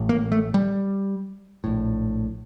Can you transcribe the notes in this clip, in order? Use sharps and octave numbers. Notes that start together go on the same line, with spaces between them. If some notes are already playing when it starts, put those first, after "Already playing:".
Already playing: A1 A2
A#3
A3
G3
A#1 A2